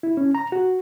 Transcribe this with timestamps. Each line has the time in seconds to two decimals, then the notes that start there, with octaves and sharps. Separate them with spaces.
0.03 E4
0.17 C#4
0.35 A#5
0.52 F#4